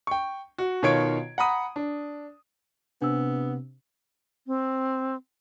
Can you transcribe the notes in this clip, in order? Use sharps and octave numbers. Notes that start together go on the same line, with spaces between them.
G5 C#6
F#4
B2 D#3 F4 C#5 G#6 D7
F#5 A#5 B5 D#6
D4
C3 B3 D4 E6
C4